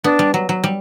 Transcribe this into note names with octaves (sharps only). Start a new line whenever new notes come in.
B3 D4
G3
F#3
F#3
G3